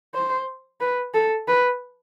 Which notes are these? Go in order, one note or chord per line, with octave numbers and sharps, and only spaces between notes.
C5
B4
A4
B4